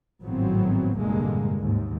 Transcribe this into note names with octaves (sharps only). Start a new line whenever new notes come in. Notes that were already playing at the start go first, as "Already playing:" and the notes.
G#1 A2 F3 F#3 B3 C4
F1 A#1 G2 D3 G#3 A#3
D#2 G#2